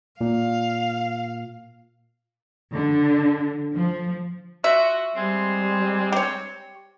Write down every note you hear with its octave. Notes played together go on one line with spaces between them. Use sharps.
A#2 F5
D3
F3
F4 F#4 E5
G3 G#3 C4
G4 C#5